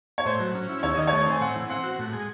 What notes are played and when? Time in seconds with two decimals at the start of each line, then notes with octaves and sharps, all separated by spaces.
0.18 C#5
0.25 A2 C5
0.40 F#3
0.54 C#4
0.69 E4
0.83 D#2 C#5
0.95 D#3 D#5
1.07 A3 C#5
1.26 C4
1.31 G#5
1.41 A2 F#5
1.56 E3
1.69 C4 F#5
1.84 F#4
1.99 A2
2.13 G#3